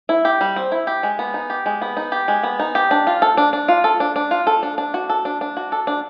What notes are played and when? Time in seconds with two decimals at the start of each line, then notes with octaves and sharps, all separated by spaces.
0.09 E4
0.25 G4
0.41 G3
0.56 C4
0.72 E4
0.87 G4
1.03 G#3
1.19 B3
1.34 D#4
1.50 G4
1.66 G#3
1.82 B3
1.97 D#4
2.12 G4
2.28 G#3
2.43 B3
2.60 D#4
2.75 G4
2.91 D4
3.07 F4
3.22 A4
3.37 D4
3.53 D4
3.68 F4
3.84 A4
4.00 D4
4.16 D4
4.31 F4
4.47 A4
4.63 D4
4.78 D4
4.94 F#4
5.09 A4
5.25 D4
5.41 D4
5.57 F#4
5.72 A4
5.87 D4